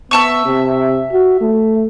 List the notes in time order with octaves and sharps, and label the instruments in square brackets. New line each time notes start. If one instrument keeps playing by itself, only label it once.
[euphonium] B3 [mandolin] E5 A5 C#6
[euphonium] C3
F#4
A3